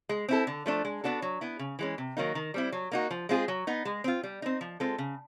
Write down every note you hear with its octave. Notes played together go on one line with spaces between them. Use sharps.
G#3
C4 E4 A4
D3
F3 A3 D4
G#3
B3 D4 F#4 A4
F#3
B3 E4
C#3
E3 G#3 C#4
C3
D#3 F#3 A#3 D#4
D#3
G3 C4 E4
F#3
A#3 D#4 F#4
F3
G#3 C4 F4 G#4
F#3
B3 D#4
G#3
C4 F4
G3
C4 D#4
F3
G#3 C4 F4 A4
C#3